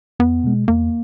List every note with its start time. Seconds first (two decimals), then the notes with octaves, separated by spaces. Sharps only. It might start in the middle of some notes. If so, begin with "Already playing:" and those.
0.20 E2 B3
0.44 B2 G#3
0.68 E2 A#3